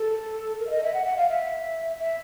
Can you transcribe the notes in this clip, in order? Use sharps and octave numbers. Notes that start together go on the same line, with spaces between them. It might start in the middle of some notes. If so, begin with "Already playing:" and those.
Already playing: A4
A#4
E5
D#5
E5
F#5
F#5
F5
E5
E5